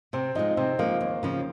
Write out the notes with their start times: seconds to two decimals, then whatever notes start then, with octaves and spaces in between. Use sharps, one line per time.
0.13 C3 C4
0.35 F3 G#3 D#4
0.57 C3 C4
0.79 F3 G#3 A#3
1.01 D#2
1.23 C#3 F3